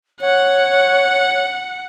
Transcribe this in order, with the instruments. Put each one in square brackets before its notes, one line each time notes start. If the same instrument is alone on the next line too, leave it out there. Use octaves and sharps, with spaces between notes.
[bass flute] C#5 [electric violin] F#5